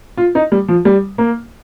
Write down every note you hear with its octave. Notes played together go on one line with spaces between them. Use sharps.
F4
D#4
G3
F3
G3
A#3